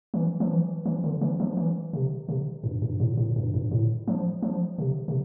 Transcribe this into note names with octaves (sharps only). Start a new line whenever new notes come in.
E3
F3
E3
E3
D3
E3
F3
E3
C3
C3
G2
G2
A2
A2
G2
G2
A2
F3
F3
C3
C3